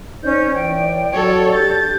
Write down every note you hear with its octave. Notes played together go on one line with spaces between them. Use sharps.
C#4 D#4 C5 D5 G6
E3 C#5 G5
F#3 A4 C#5
D4 G4 G6 A6